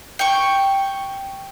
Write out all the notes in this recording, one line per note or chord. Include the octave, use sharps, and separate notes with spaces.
G5 C#6